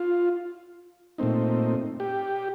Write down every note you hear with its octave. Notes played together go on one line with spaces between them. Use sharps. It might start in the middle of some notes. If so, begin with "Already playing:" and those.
Already playing: F4
A#2 A3 C4 D#4
G4